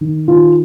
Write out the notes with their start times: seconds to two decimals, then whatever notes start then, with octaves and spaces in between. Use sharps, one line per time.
0.01 D#3
0.28 D#3 F4